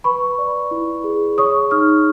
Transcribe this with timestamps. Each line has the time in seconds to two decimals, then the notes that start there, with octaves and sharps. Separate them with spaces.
0.04 B4 B5 C#6
0.38 D5
0.71 E4
1.04 G#4
1.38 C#5 C#6 D#6
1.71 D#4 D#6 F6